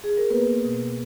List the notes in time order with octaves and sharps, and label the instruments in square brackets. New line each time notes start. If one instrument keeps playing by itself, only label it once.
[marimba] G#4
A#4
A#3 B3 B4
A#3
B2
B2